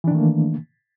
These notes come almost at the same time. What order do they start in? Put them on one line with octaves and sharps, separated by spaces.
E3 D4 D#3 A3 A#3